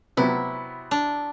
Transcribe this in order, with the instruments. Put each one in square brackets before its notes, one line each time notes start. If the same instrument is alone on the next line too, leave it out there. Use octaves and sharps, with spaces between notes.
[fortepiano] C3 F#3 B3 F#4 [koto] E4
[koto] D4